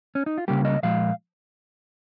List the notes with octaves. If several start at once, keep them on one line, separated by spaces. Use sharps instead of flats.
C#4
D#4
F4
C#2 C#3 G3 A#3 G4
D#5
A#2 F3 G#3 F5